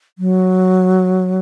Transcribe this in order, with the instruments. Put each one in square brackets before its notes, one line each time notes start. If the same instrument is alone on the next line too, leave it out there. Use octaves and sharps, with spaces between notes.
[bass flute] F#3